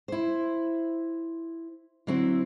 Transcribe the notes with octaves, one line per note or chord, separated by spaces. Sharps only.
E4 C5
D3 F#3 C4 E4